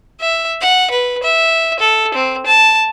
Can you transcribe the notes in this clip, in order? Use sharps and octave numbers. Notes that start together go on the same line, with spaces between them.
E5
F#5
B4
E5
A4
C4
A5